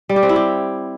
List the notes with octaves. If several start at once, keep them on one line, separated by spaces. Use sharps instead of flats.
G3
G4
C4
E4
G4